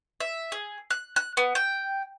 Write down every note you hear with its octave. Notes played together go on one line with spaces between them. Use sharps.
E5
G#4
F#6
F#6
B3
G5